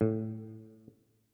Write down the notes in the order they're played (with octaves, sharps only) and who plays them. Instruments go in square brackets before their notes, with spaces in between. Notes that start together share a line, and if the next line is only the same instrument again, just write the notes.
[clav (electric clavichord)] A2